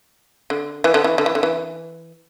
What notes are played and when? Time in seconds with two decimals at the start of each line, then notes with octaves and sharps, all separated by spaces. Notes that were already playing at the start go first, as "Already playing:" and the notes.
0.50 D3
0.84 E3
0.94 D3
1.04 E3
1.18 D3
1.26 E3
1.35 D3
1.43 E3